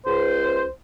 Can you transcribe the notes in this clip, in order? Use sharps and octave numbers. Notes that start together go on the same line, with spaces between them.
C#2 C5